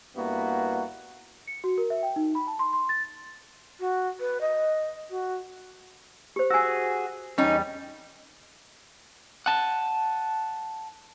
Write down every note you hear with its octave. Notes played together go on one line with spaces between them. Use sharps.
G2 A#3 B3 E4 F#4
C#7
F#4
A#4
E5
G5
D#4
B5
A5
C6
C6
A6
F#4
B4
D#5
F#4
G4 C5
F#4 G#4 G#5 E6
E2 G3 C#4 D#4
F#5 A5